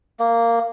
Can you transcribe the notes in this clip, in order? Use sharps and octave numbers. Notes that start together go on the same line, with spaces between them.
A#3